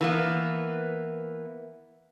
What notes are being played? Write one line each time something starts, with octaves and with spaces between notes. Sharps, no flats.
E3 A#3 B3